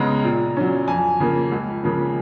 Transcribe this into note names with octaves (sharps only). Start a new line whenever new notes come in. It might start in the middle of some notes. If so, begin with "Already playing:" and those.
Already playing: C#2 C#3 G#3 B3 A#5
A#2
F#3 C#4
F2 G#5
C#3 F3 A#3
C#2
C#3 F3 A#3